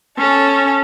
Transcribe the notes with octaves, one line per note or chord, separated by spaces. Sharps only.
C#4 A4 A5